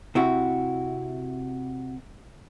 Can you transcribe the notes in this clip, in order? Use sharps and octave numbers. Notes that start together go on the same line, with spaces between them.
C3 E4 F#4